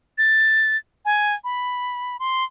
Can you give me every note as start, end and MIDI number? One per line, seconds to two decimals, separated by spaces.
0.18 0.77 93
1.05 1.34 80
1.44 2.17 83
2.20 2.44 84